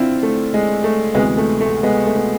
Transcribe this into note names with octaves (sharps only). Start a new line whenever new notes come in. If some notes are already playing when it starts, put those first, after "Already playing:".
Already playing: D3 C4 D4 E4 F4
A3
G#3
A3
D2 C3 E3 G#3 B3
A3
A3
G#3 B3
A3
B3